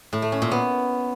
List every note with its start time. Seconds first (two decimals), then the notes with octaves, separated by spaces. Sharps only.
0.13 A2
0.22 A3
0.32 C#4
0.42 A#2
0.51 B3